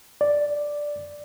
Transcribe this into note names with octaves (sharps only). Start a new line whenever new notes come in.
D5